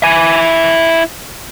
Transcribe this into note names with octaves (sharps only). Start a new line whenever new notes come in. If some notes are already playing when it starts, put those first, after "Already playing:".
E4 G#5